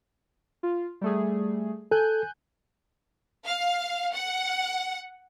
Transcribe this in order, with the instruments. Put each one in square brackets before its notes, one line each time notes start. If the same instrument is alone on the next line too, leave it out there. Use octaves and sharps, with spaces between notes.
[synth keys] F4
G3 A3 G#4
[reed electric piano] A4 [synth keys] G#5 F#6 G6
[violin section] F5
F#5